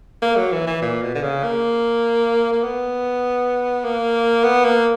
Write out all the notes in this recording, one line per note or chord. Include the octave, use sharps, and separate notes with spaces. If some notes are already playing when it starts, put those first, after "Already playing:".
A#3
F#3
E3
E3
A#2
B2
D3
C#3
A#3
A#3
B3
A#3
B3
A#3